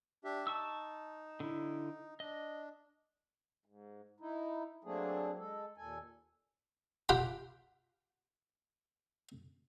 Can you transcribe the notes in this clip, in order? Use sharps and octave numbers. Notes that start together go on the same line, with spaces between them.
D4 G4 E5
D#4 A5 C#6 E6
D3 E4
D4 D#5
G#2
D#4 E4
F#3 A3 A#3 C4 D4 G#4
G#3 A4
D#2 A#2 A4 G#5
F4 G4 F#5 G5 B5